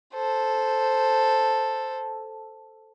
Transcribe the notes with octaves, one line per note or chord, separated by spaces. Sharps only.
A4 C5